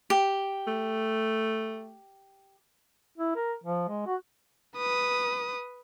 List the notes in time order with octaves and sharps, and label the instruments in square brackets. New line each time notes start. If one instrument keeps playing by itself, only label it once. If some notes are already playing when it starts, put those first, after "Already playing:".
[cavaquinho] G4
[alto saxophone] A3
[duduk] E4
A#4
F3
G#3
F#4
[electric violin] B4 D#6